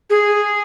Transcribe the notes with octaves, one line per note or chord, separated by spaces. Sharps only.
G#4